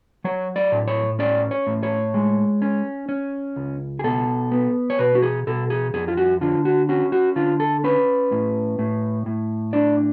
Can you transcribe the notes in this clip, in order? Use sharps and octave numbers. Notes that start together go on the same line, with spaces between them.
F#3 C#5
D5
A2
C#5
C#4 D5
C#5
A2
C#5
G#3
C#4
C#4
C#2
G#4
B2 A4
B3
C#5
B2 B4
F#4
G#4
B2 A4
G#4
F2 G#4
F4
F#4
D3 F4
F#4
C#4 F#4
F#4
D3 F4
A4
C#4 B4
A2
A2
A2
D4 D5